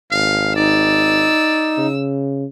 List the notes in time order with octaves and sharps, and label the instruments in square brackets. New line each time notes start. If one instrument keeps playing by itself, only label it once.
[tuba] G#1 [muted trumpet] F5
[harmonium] D#4 [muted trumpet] D5 [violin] E6
[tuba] C#3